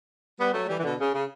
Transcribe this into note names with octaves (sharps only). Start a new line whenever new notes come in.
G3 B3
F#3 A3
E3 G3
E3
B2 D3
C#3
C#3